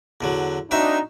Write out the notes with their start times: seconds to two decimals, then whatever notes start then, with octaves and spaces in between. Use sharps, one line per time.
0.21 E2 D3 F#3
0.71 C4 D4 D#4 F#4 E5